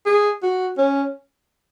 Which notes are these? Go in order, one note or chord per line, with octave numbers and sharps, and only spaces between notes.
G#4
F#4
C#4